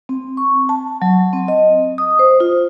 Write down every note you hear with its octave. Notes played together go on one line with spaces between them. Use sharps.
C4
C#6
A5
F#3
C4
D#5
D#6
C5
F4